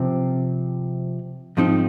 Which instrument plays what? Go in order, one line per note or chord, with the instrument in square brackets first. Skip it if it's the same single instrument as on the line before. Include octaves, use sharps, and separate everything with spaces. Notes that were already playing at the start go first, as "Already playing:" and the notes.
Already playing: [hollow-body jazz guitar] C3 F3 C4
G#2 F3 C4 D#4